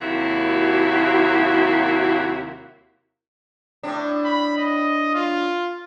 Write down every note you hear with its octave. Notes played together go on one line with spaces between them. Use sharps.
D#2 C3 F#3 A#3 E4 F#4
A2 D4
B5
D#5
F4